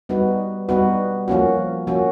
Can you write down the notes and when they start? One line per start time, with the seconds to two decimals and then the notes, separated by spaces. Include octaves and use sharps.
0.09 G3 B3 D#4 F#4 B4
0.69 G3 B3 D#4 F#4 B4
1.28 F3 A#3 C#4 F#4
1.87 F3 A#3 C#4 F#4